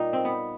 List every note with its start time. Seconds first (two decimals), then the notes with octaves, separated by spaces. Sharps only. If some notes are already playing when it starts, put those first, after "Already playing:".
Already playing: A#2 G3 A#3 D#4
0.13 C4
0.25 B3